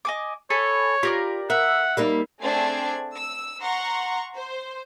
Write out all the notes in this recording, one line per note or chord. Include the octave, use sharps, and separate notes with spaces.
D#5 G#5 D6
A4 C#5 G#5 B5
F4 G4 A#4 D5
A#4 E5 F#5
G3 A#3 D#4
A3 C4 D4 G#4 G#6 C7
E6
F#5 A#5 C6 C#6
C5